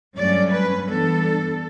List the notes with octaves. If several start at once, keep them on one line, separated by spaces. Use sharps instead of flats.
G2 F#3 A3 C#4 D5
B4
G2 E3 B3 D4 A4